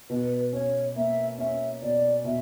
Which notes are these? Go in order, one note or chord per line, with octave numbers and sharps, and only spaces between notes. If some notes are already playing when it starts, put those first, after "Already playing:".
B2 B4
C#4 C#5
A#3 E5
C#4 E5
B2 D5
B2 E5